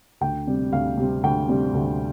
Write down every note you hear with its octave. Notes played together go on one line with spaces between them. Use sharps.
D2 G5
C3 G3 C4
D2 F5
C3 G3 C4
D2 G5
C3 G3 C4
D2